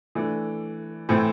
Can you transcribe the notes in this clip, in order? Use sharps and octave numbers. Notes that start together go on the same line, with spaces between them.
E3 A3 D4
A2 E3 A3 C4